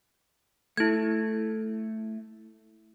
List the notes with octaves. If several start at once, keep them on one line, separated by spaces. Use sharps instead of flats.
A3 E4 G#6